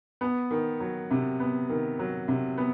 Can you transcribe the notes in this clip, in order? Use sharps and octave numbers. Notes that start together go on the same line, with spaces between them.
B3
D#3
F#3
C3
B3
D#3
F#3
C3
B3